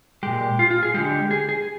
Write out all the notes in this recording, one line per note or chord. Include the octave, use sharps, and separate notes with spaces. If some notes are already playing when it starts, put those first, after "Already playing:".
A#2 G#3 G4
F4
F4
G#4
D3 G#3 G4
G#4
G#4